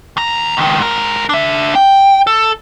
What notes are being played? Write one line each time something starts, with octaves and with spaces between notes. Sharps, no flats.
D#2 A#5
C#2 D#3
G#2 A#4
D4 E5
G5
A4